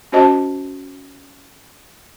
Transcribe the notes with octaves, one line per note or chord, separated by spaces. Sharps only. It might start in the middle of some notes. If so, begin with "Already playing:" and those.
C#4 F#4 C5 D#5 A5